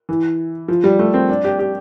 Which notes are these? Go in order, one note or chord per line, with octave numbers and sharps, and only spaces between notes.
E3
F3
G3
A3
C4
D4
G4
G4